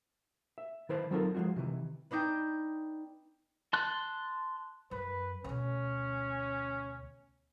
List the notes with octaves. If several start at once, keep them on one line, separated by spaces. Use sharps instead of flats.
E5
D#3 E4 B4 C5 A5 B5
F#3 C4 D#4 F4 A4 A#4
F3 G#3 A#3 F4 F#4
C3 D#3 E3
B3 D4 D#4 G5
A5 C6 F#6
F#2 B4
D2 B2 C#4